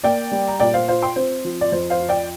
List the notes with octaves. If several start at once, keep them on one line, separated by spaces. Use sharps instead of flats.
A#3 D5 G5
G3
A#5
A#2 D5 G5
C5 F5
F4 C5 F5
G5 C6
C4 C5
F3
D5
F2 C5
C5 F5
F4
D5 G5